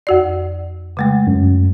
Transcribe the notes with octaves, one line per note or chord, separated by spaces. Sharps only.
F2 F#4 D5
C#3 G#3 A3
F#2